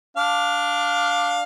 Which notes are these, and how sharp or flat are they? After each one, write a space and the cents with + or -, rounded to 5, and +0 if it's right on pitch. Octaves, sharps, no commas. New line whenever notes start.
D4 +0 F5 +15